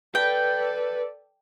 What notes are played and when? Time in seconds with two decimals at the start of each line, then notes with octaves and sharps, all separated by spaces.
0.15 A4 B4 D5 G5